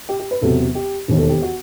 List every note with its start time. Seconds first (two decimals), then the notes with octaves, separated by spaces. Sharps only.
0.09 G4
0.20 G4
0.31 B4
0.42 E1 E2 C3 F#3 A4
0.75 G4
1.08 E1 D#2 D#3
1.18 A4
1.29 G4
1.42 F#4